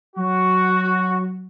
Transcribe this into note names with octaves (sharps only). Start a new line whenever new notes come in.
F#3 F#4